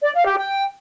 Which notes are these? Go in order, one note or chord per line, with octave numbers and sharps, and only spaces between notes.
D5
F5
G4
G5